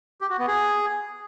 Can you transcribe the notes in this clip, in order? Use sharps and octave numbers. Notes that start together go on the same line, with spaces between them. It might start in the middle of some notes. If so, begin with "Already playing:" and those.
G4
F#4
B3
G#4